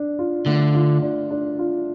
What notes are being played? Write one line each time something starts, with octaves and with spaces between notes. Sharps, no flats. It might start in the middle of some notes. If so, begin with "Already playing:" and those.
Already playing: D4
F4
D3 A3
F4
D4
D4
F4